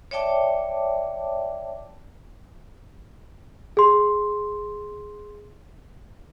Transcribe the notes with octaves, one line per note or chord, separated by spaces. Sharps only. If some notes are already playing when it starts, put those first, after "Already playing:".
C#5 D5 E5 G5 A5 D6
G#4 C6